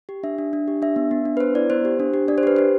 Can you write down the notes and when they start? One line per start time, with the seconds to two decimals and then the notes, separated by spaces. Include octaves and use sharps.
0.09 G4
0.23 D4 E5
0.38 D4
0.53 D4
0.68 G4
0.82 D4 E5
0.96 B3
1.11 B3
1.25 D4
1.37 B4
1.40 B3 C5
1.55 E4 D5
1.70 B3 C5
1.85 G4
2.00 D4
2.14 G4
2.28 D4 D5
2.38 C5
2.43 G4 B4
2.56 G4 C5